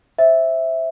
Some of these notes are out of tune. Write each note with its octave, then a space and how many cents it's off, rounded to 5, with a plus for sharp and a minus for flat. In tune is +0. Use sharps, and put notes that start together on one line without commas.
C5 +20 E5 -5